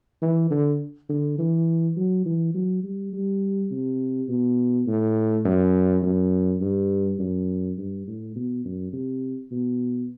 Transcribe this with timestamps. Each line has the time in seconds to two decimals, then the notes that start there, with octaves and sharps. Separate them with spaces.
0.22 E3
0.51 D3
1.09 D3
1.39 E3
1.97 F#3
2.25 E3
2.55 F#3
2.84 G3
3.13 G3
3.71 C3
4.29 B2
4.87 A2
5.45 F#2
6.03 F#2
6.61 G2
7.19 F#2
7.78 G2
8.07 A2
8.36 B2
8.65 F#2
8.93 C3
9.52 B2